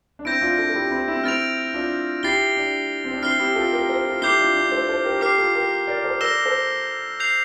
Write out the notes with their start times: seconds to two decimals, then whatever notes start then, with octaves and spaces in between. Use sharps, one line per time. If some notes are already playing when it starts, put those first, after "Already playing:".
0.19 D4
0.25 C4 E4 G6 A#6 D7
0.41 D4 F4
0.58 F4 A4
0.69 A4
0.75 E4 G4
0.91 C4 E4
1.08 C4 E4
1.24 C4 E4 F6 A6 D7 F7
1.74 D4 F4
2.23 E4 G4 A6 C7 G7
2.57 D4
3.04 C4
3.14 D4
3.23 C4 E4 F6 C7 G7
3.39 E4 G4
3.55 F4 A4
3.72 G4 A#4
3.89 A4 C5
4.05 F4 A4
4.22 E4 G4 D6 G6 C7 G7
4.38 D4 F4
4.55 D4
4.72 A4 C5
4.88 A4 C5
5.05 G4 A#4
5.21 G4 A#4 D6 F6 C7
5.38 F4 A4
5.55 G4 A#4
5.87 A#4 D5
6.04 A4 C5
6.21 A#4 D5 E6 A#6 E7 G7
6.45 A4 C5
7.20 G6 C7 F7